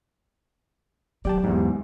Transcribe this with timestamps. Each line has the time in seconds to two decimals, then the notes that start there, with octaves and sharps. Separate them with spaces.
1.25 F#3 G4 D5 G5 A5
1.44 E2 G#2